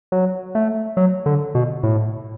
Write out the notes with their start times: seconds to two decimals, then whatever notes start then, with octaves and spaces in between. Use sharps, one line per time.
0.12 F#3
0.55 A3
0.97 F#3
1.26 D3
1.55 B2
1.83 A2